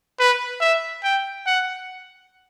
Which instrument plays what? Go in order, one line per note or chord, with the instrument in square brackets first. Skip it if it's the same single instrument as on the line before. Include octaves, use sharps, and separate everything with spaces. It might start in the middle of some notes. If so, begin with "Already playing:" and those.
[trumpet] B4
E5
G5
F#5